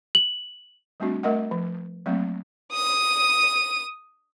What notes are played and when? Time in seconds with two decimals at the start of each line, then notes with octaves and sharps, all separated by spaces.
0.15 F#7
1.00 G3 A3 C4 D4 F#4
1.23 A3 A#4 D#5 F#5
1.51 F3
2.06 F#3 A3 A#3 C4
2.73 D#6 D#7